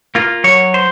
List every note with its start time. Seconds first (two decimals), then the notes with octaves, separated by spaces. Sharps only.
0.15 A#3 F4
0.44 F#3 C#5
0.74 C5